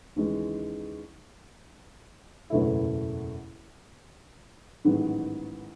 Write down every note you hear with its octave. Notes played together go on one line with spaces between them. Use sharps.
D#2 C#3 E3 G#3
F#1 E2 B2 A3 E4
A1 G#2 D#3 F#3 B3